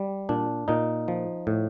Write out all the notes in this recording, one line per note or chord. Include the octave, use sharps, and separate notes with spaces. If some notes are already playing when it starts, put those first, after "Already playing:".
Already playing: G3
A#2 D4
A#2 D#4
F3
A2